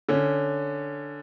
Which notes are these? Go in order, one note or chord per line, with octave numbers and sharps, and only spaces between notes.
D3 C#4